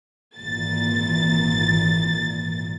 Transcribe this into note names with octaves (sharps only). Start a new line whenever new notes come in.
G#1 A#2 E3 A6